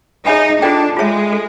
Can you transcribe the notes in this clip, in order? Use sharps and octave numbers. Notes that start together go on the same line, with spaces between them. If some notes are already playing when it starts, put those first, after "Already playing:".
D#4 G#4 C#5 E5 G#5 B5
D4 F4 A4 D5 G5
G#3 F4 G#4 C#5 E5
A4